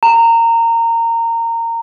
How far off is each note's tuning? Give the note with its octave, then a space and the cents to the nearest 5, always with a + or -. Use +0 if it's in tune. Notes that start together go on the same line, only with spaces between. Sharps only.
A#5 -20